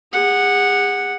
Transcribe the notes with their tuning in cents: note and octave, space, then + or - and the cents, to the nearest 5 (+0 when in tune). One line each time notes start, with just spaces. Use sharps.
G#4 -40 F#5 +0